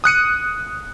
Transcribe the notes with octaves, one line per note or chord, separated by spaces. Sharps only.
D#6 F#6 C#7 D#7